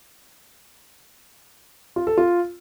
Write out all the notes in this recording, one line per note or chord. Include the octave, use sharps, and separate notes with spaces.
F4
A4
F4